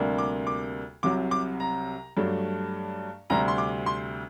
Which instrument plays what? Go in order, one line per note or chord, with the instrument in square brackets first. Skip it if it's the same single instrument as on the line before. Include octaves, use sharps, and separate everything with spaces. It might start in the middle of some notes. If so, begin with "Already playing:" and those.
Already playing: [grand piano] D2 C3 G3 A#3 D4
D6
D6
C2 C3 F#3 D6
D6
A#5
G2 F#3 A3 D4
D2 C3 G3 C4 A#5
C6
D6
C6